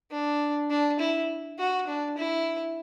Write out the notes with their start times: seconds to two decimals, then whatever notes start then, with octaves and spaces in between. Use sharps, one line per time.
0.11 D4
0.70 D4
0.99 E4
1.59 F#4
1.87 D4
2.18 E4